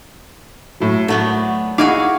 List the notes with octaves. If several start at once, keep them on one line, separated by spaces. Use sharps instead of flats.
A2 F#3
F#3 A3 B3 D4
D#4 E4 F#4 G#4 F5 D6